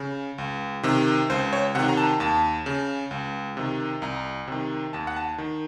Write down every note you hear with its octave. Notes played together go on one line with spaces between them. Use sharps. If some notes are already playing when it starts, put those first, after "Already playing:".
Already playing: C#3
C#2
C3 D#3
C#2 C5
C#5
C3 D#3 F#5
A#5
A5
D#2 A5
C#3
C#2
C3 D#3
C2 A#5
C3 D#3
D#2 A5
F#5
A5
D#3